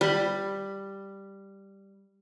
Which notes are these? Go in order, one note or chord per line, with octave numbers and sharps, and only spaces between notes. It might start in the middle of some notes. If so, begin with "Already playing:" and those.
G3 B5